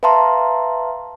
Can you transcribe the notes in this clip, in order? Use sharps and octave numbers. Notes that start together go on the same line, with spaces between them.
B4 E5 F5 A5 A#5 C6